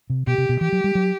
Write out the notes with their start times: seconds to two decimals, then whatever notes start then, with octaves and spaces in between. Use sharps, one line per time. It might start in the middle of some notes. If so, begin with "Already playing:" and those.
0.10 C3
0.27 B2 G4
0.38 C3
0.49 B2
0.61 E3 G4
0.72 F#3
0.84 G3
0.95 F#3